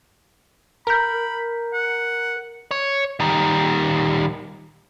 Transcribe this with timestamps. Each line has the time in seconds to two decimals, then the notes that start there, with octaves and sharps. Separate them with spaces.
0.87 A#4 A#5 B5 G6
1.73 F#5
2.71 C#5
3.20 D#3 G3